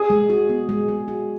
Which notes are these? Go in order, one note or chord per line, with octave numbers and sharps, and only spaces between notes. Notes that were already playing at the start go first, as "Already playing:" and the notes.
Already playing: G#4
G#3
F#4
B3
G#3
G#3
F#4